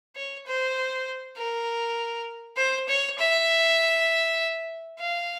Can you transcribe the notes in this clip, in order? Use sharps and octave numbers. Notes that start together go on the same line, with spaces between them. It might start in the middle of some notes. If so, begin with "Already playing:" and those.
C#5
C5
A#4
C5
C#5
E5
F5